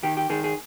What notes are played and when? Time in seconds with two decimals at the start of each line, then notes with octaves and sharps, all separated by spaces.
0.03 D#3 G4
0.17 G4
0.30 D#3 G#4
0.44 G#4